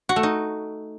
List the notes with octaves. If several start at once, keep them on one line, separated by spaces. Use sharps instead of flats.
F#4
A3
D#4